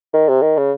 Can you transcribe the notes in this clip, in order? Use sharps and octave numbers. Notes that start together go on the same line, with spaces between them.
D#3
C3
D#3
C#3